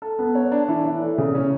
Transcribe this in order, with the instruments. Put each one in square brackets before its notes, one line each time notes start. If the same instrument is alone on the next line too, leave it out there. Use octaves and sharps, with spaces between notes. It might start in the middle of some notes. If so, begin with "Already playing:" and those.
[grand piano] A4
B3
C#5
D4
E3
E3
A3
C#3
C#4